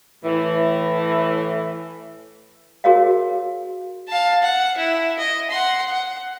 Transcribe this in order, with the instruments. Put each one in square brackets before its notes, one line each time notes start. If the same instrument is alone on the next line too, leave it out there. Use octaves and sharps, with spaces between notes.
[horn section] A2 E3
[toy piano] F#4 G#4 A#4 C#5 D#5 F5
[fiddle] F5 A5
F#5
E4
D#5
F#5 C6
F#5